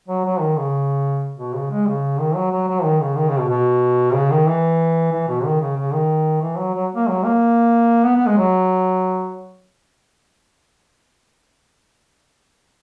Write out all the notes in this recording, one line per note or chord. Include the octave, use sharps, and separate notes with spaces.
F#3
F#3
D#3
C#3
B2
C#3
G#3
C#3
D#3
F#3
F#3
F#3
D#3
C#3
D#3
C#3
B2
B2
C#3
D#3
E3
E3
B2
D#3
C#3
C#3
D#3
E3
F#3
F#3
A#3
F#3
A#3
B3
B3
G#3
F#3